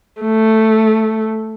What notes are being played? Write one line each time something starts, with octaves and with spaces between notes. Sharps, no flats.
A3